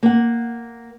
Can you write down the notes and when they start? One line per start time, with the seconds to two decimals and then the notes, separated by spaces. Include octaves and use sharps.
0.03 A#3 F#5